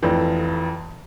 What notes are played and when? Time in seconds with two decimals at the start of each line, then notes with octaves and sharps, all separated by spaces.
0.03 F1 F2 E3